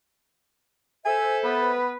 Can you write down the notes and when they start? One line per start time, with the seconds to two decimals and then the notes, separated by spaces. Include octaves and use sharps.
1.05 A4 C5 E5 G#5
1.44 B3 B4